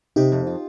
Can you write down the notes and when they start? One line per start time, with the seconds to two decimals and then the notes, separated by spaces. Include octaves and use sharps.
0.16 C3 D#4 G4
0.32 F2
0.47 F4